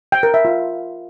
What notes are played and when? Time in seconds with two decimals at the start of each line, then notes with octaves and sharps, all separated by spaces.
0.12 G5
0.23 A#4
0.34 E5
0.45 F4